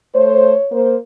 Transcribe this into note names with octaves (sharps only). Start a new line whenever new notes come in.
A3 C5 C#5
A#3 C5